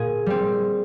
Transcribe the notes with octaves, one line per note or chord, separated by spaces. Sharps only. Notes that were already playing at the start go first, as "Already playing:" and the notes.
Already playing: A#2 G#4
G3 C4